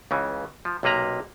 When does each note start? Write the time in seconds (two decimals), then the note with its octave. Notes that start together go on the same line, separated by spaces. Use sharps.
0.11 C#2 C#3 E3
0.65 F3
0.83 B1 C3 A#3 B4 A#5